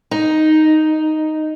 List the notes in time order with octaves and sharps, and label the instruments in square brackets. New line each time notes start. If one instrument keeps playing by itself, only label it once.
[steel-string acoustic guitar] D#4